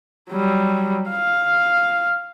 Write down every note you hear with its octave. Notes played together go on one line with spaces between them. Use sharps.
F#3 G3
F5